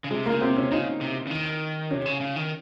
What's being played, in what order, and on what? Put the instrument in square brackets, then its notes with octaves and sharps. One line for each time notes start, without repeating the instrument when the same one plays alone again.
[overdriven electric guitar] C#3
[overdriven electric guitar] C3 [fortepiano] G#3
[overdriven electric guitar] C#3 [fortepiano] A#3
[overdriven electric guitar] C3 [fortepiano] C4
[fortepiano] C#4
[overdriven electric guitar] C#3 [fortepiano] D#4
[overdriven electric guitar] C3
C#3
D#3
[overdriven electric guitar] C3 [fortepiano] C#4
[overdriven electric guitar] C#3
C#3
D#3